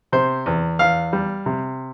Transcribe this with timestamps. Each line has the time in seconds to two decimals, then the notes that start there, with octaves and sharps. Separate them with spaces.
0.12 C3 C5
0.46 E2
0.79 E2 F5
1.13 G3
1.46 C3